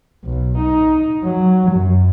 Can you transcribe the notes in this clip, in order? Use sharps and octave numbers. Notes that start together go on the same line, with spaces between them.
B1
D#4
F#3
F#2